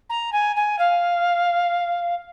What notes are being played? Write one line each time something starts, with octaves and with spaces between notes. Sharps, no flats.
A#5
G#5
G#5
F5